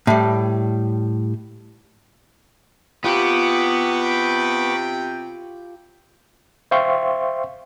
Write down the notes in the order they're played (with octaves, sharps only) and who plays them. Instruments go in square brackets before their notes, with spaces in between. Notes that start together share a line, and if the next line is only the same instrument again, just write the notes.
[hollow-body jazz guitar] A2 G3
[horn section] C3 G5 [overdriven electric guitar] B3 [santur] F4 G4 [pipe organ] B5 C#6 D6
[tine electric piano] C5 E5 F5 G5 C6 C#6